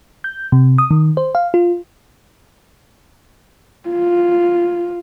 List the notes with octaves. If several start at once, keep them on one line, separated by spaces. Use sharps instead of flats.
G6
C3
D#6
D#3
C5
F5
F4
F4